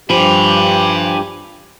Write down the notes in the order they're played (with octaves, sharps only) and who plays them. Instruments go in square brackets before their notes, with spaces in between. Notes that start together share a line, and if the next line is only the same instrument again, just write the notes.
[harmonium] G2 G4 [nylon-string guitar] F3 [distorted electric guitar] G#5 B5